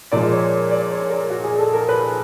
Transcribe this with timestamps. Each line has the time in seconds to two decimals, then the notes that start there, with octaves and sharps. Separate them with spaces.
0.12 A#2 F3 G#3 D5
0.32 C#5
0.71 D5
0.91 C#5
1.10 A#4
1.30 F#4
1.44 G#4
1.59 A4
1.73 A#4
1.89 B4